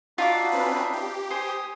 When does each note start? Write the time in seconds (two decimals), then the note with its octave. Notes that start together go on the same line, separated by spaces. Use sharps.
0.18 D4 D#4 F4 F#4 E5 D6
0.52 C4 C#4 B4
0.93 G4
1.30 C5 G#5 D#6